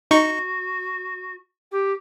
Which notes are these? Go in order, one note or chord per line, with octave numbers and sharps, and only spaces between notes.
D#4 F#4 C#6
G4